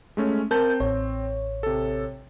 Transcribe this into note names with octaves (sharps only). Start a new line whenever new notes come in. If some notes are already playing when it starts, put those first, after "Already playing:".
G#3 A3 C#4
C4 A#4 A5 G6
A1 C#5
C3 A4